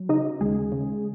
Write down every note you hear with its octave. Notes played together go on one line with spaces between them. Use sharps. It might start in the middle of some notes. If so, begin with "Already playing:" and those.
Already playing: F#3
C#3 D#4 D#5
D#2 G#3 G#4
C#3